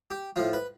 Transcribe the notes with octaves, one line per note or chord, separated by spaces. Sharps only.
G4
A2 F3 F4
B4